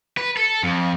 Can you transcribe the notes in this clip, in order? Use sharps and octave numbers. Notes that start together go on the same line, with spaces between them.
B4
A4
F2